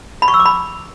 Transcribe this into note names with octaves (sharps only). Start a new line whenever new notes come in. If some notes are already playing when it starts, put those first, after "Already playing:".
B5
C#6
E6
D6
B5